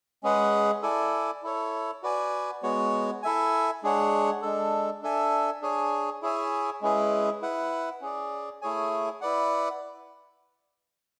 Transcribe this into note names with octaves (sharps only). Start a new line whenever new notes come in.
G#3 C#4 G#4 B4 F#5
E4 A4 D5 G#5
E4 A4 C#5
F#4 B4 D5 G#5
G#3 B3 F#4 C#5
E4 A4 E5 G#5
G#3 D4 G#4 C#5 F#5
G#3 D4 A4
D4 A4 E5 G#5
D4 G#4 C#5 G#5
E4 G#4 C#5 E5 G#5
G#3 C#4 E4 G#4 B4
E4 B4 F#5
C#4 G#4 D5
A3 E4 G#4 C#5 G#5
E4 B4 D5 F#5